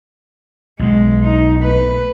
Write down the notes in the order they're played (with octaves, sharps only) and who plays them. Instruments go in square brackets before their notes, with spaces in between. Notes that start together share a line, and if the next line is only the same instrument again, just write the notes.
[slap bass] B1 B2 [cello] G#3
[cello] D#4
A3 B4